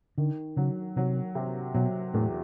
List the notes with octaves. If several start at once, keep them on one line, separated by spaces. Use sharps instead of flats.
D3 D#3
C#3 F#3
C3 F#3
C3
B2 F#3
E2 A2